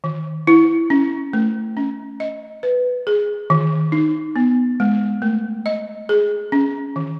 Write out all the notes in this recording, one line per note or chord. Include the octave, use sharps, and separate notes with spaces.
D#3
E4
C#4
A3
C#4
D#5
B4
G#4
D#3
D#4
B3
G#3
A3
D#5
G#4
C#4
D#3